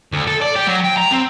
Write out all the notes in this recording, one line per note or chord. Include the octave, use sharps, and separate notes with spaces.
D2
A4
D5
G4
F#3
G5
A#5
C4